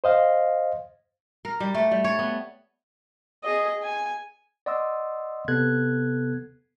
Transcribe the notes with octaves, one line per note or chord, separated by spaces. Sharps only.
C5 D#5 F5
A#4
G3
A3
G3
C#5
B3
G#4 D#5
G#5
D5 D#5 F#5 C6 D#6 E6
C3 B3 A4 F#6 G#6